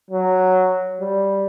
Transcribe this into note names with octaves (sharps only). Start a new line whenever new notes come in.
F#3
G3